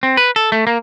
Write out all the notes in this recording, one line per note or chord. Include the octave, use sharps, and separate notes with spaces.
C4
B4
A4
A3
A#3